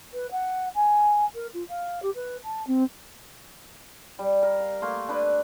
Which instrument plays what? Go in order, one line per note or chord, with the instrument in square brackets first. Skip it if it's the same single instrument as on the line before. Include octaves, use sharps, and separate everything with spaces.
[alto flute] B4
F#5
G#5
A#4
F4
F5
G4
B4
A5
C4
[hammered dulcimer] G3
A#4
F5
A3 A#3 C6
D4 B4